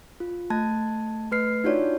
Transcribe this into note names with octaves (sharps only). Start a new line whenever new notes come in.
F4
A3 A5 G#6
A3 B4 F6 C7
D4 D#4 F4 F#4 C#5 D5